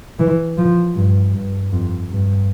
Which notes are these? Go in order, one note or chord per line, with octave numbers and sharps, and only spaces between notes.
E3
F3
G2
G2
F2
G2